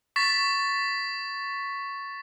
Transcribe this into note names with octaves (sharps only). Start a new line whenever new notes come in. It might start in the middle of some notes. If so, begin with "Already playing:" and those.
C#6 A6 B6